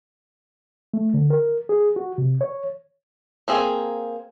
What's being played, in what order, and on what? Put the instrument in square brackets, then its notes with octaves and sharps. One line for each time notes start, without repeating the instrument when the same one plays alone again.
[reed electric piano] A3
D3
A#4
G#4
F#4
C3
C#5
[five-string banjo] A#3 C4 G#4